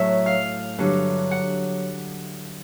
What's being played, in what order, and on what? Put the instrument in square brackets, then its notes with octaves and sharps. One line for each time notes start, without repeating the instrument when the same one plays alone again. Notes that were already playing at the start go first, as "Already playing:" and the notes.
Already playing: [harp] A2 F#3 E5
F5
G2 D3 F#3
F#5